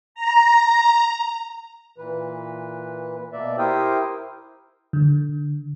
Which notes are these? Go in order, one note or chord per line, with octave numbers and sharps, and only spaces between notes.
A#5
A#2 E3 B4
B2 A#3 D5 E5
E4 G4 A#4 C5 G5 D#6
D3